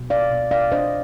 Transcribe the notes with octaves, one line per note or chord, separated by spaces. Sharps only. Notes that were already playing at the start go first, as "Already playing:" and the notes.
Already playing: B2
D5 F5
B2
D5 F5
D4 C5 D#5